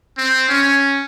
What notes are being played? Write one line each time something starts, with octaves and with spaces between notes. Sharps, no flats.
C4
C#4